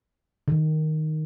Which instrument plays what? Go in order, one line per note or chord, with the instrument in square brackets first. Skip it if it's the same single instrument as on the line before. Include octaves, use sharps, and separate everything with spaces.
[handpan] D#3